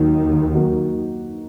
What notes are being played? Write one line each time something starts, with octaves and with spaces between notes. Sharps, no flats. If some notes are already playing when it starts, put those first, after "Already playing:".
Already playing: D#2 D#3 F#3 A#3 D#4 F#4
F#3 A#3 D#4 F#4